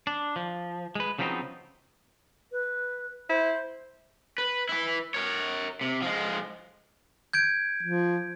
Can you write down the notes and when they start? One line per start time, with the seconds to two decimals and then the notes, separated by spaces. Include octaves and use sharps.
0.07 D4
0.36 F3
0.95 G#3 B4
1.19 C#3 F3 F#3 B3 C4 D#4
2.52 B4
3.29 E4 C5
4.38 B4
4.69 E4 B4
5.14 A#4 C#5
5.81 C3
6.02 F3 G#3
7.33 G6 G#6 D7
7.83 F3